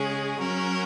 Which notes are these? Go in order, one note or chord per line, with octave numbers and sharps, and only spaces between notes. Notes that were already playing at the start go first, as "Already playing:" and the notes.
Already playing: C#3 G#3 C#4 G#4
F#3 C#4 F#4 A#4